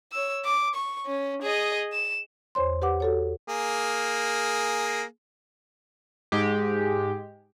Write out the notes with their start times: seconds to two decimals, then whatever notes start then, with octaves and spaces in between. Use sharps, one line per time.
0.12 C#5 E6
0.45 D6
0.75 C#6
1.06 C#4
1.42 G#4 D#5
1.93 E7
2.55 E2 C5 C#5 C6
2.82 G4 B4 F#5 D6
3.00 F#4 A4 C#5
3.48 A#3 G#4
6.32 G#2 G#3 G4